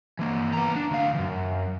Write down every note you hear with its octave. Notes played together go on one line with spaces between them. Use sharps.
E3 A#3
B3 A#5
D4
D2 F5
F#2 E3